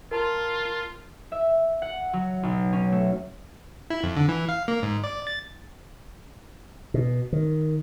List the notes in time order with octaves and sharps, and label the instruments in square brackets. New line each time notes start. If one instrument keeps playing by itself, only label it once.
[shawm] F4 [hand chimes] A#4 A5 C6
[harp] E5
F#5
F#3
B1
C#4
A3
[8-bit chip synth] E4
F2
D3
E3
F5
A#3
G#2
D5
A6
[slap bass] B2
D#3